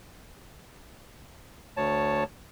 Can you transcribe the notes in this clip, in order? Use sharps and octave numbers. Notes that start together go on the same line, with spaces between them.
D2 C#5 A5